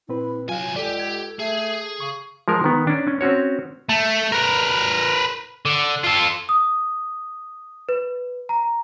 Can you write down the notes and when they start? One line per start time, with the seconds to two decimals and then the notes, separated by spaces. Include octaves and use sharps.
0.09 A#2 C4 E4 B4
0.49 C2 F#3 F4 F5 G#5
0.76 C#2 G4 A4 D5
1.00 G#6
1.40 A3 G#4
2.00 C#3 C#6
2.48 F3 G#3 A#4
2.64 D#3 B3
2.87 C#4 D4
3.07 C#4
3.21 C4 C#4 F#4 C#5
3.89 A3
4.32 A#4 B4
5.66 D3
6.04 F4 A4
6.49 D#6
7.89 B4
8.49 A#5